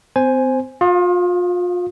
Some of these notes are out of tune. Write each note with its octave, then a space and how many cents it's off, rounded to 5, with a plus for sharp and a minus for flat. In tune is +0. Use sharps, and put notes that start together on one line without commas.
C4 -35 C5 +0 G#5 +0
F4 +35 F5 +0 D#6 +0